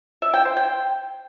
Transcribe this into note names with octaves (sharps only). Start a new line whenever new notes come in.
E5
G5
C5
G5